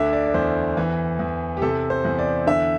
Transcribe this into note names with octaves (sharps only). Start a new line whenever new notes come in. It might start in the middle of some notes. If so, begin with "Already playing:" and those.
Already playing: D2 D3 E5
D5
D5
E2 C5
E3
E2
G4
C3 A4
C5
E2
D5
D3 E5